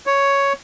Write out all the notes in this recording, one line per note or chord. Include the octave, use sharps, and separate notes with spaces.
C#5